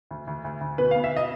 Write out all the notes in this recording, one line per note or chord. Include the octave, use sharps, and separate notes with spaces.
D2
D2
D2
D2
B2 B4
F5
B2
E5
D#5